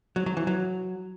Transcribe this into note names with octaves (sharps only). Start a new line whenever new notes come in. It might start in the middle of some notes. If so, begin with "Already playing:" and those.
F#3
F#3
E3
F#3